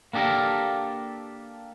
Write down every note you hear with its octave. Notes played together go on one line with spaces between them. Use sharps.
A#3 D4 G4 A4 A#4